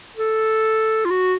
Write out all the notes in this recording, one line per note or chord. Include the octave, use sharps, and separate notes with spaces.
A4
F4
F#4